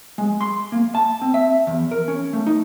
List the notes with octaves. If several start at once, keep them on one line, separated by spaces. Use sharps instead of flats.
G#3
C6
A#3
A5
C4
E5
E2
A#4
C#4
A3
D#4